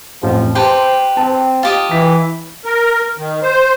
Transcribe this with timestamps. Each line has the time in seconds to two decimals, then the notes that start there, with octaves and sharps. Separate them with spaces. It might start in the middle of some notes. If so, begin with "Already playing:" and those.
0.23 A1 F2 F3
0.55 G4 B4 C5 G5 A5 C6
1.17 C4 A5
1.63 F4 G4 D#5
1.91 E3 E4 B6
2.65 A#4
3.18 D#3
3.43 C5